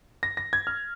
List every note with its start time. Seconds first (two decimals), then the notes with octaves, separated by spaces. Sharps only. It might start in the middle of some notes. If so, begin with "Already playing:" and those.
0.23 A#6
0.37 A#6
0.53 G#6
0.67 F6